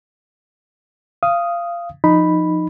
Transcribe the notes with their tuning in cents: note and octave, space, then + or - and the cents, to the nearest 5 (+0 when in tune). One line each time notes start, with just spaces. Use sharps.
F5 -20 D#6 +0
F3 +0 D#4 -10 B5 +0